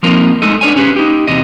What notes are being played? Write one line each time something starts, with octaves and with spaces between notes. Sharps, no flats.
F3 A#3 C4 D#4 F4 A#4
G#3 A3 D#4 A4 D#5
B3 D4 C#5 G#5
C#4 G4 G#4 B4
D#4 G4
E2 C3 D#5